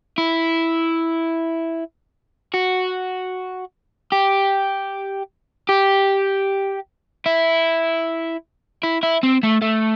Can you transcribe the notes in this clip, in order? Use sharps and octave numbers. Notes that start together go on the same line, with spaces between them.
E4
F#4
G4
G4
E4
E4
E4
C4
A3
A3